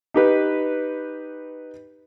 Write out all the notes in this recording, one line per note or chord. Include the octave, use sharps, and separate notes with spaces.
D#4 G4 B4